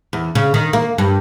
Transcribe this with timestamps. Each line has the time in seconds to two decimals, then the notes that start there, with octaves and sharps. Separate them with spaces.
0.13 E2
0.35 C#3
0.54 D#3
0.73 A#3
0.98 G2